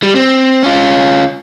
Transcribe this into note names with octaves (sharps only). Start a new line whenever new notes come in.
G3
C4
C#4 F4